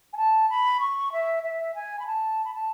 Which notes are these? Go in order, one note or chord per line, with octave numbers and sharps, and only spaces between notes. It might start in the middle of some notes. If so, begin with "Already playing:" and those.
G#5
A5
B5
C#6
E5
E5
G#5
B5
A5
B5
A5